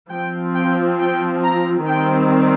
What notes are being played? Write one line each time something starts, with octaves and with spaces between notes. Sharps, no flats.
F3 C4 G5
G5
G5
A#5
D#3 G3 C4 G5